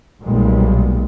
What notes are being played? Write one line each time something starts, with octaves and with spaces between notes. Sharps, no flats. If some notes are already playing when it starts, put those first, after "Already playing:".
B1 A#2 G3 G#3